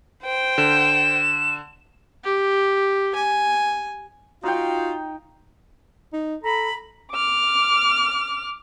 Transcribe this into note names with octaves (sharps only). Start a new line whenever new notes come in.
C5 G5
D3 E7
G4
G#5
D#4 F4 F#4 G5
D#4
A4 A#5 B5
D6 F6